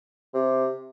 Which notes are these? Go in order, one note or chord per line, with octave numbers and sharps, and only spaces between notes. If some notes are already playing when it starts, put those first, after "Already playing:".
C3